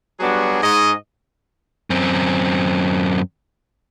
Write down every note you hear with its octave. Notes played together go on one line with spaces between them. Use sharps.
F#3 G3 B3 D4 F#4 G#4
G#2 D#5
F#2 C4